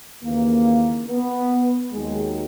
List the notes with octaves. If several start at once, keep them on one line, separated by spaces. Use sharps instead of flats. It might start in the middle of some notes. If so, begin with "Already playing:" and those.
D#2 C#3 E3 A#3
B3
D#2 D#3 F#3 G#3